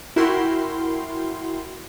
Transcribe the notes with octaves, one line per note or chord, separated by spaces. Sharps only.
E4 F#4 A#4 G5 C6 F6